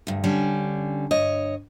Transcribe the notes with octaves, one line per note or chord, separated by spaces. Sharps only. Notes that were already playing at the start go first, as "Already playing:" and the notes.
D2 G2
D3 G3 C#4 G#5
G2 C#5 D#5